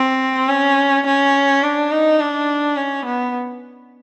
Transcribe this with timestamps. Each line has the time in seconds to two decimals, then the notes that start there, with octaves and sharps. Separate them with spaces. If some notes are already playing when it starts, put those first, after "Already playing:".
Already playing: C4
0.49 C#4
1.06 C#4
1.63 D4
1.91 D#4
2.20 D4
2.77 C#4
3.05 B3